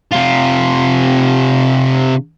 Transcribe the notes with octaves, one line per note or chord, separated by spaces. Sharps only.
C3 F4